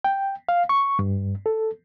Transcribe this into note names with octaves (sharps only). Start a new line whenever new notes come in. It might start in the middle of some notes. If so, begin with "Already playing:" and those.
G5
F5
C#6
G2
A4